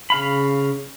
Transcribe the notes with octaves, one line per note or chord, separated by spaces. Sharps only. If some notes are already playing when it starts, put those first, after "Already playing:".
C#3 F5 B5